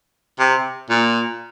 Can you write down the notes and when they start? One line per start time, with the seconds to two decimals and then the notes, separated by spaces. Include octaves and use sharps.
0.39 C3
0.90 A#2